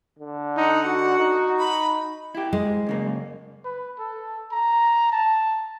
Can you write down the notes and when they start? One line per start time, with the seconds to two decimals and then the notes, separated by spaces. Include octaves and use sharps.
0.19 D3
0.57 D#4 F#5
0.86 F#4
1.20 D#4
1.59 B5
2.35 E4 G4
2.53 G#3
2.65 G#2
2.87 F#2 C#3 A#3
3.65 B4
3.99 A4
4.52 A#5
5.12 A5